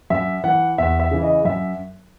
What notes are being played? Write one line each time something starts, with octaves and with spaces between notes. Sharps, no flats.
F#2 E5
E3 F#5
E2 E5
E5
C#3 E3
D#5
F#2 E5